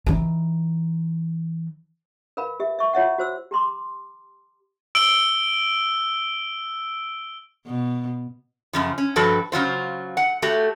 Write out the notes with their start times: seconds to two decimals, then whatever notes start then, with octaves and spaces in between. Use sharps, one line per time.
0.06 E3 D#4
2.37 A#4 B4 F5 B5
2.60 G4 E5
2.79 E5 C#6
2.93 F4 C#5 E5 F#5
3.18 F#4 C5 E6
3.51 G4 A#5 C6 D6
4.95 E6 D7 G7
7.67 B2
8.73 F#2 C#3 F3
8.98 C#4
9.16 G2 F3 F#4 A4 B4 G5
9.52 C#3 F#3 F4 C5
10.17 F#5
10.42 A3 F#4 G4